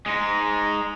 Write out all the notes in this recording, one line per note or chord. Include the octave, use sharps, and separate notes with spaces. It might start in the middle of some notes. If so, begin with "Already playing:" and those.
G#3 D#4